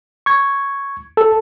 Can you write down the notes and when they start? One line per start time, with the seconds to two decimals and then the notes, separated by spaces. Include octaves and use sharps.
0.26 C#6 G#6
1.17 A4